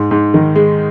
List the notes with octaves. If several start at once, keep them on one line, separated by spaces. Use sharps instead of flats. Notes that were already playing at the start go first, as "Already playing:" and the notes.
Already playing: G#2
G#2
D#3
G#3